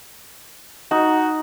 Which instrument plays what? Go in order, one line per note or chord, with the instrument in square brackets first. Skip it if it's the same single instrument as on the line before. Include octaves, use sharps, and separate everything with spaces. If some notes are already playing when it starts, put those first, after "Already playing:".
[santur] D#4 [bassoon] F#4